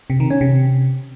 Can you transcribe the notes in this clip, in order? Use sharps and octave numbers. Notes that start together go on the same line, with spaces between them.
C3
D#3
C#4
C3